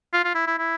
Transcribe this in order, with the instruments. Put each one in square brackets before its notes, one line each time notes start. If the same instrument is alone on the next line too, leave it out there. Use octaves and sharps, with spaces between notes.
[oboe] F4
F4
E4
E4
E4